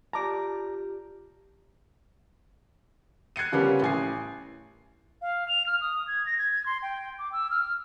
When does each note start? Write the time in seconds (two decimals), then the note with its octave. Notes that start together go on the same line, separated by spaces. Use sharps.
0.13 F4 G4 D5 A5 A#5 D6
3.36 F#6 G#6 C7 C#7 D#7
3.52 C#3 F3 G3 A#3 B3 C#4
3.82 A1 G#5 C7
5.22 F5
5.48 F7
5.67 F6
5.81 D#6
6.07 G#6
6.26 A#6
6.38 G#6
6.66 C6
6.82 G5
7.19 D6
7.33 E6
7.51 F6